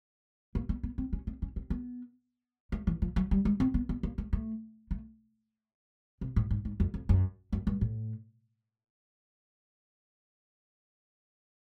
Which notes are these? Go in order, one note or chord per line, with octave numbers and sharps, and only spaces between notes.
A#3
B3
B3
C4
C#4
C4
C#4
C4
B3
A3
E3
F3
F#3
G3
G#3
C4
B3
B3
A#3
A3
A3
A3
C3
A2
G#2
G#2
F2
F2
F#2
F#2
G2
A2